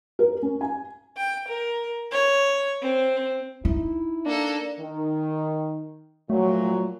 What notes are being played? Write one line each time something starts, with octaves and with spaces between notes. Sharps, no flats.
A#4
C#4
G#5
G5
A#4
C#5
C4
D#4 E4
A#3 D4 A4
D#3
A#2 F3 F#3 A3